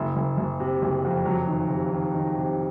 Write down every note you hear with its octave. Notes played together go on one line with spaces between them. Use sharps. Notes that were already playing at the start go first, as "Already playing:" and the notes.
Already playing: F#1
F#1
F#1
C3
F#1
F2
F#3
D#3
C3
D#3
D#3
C3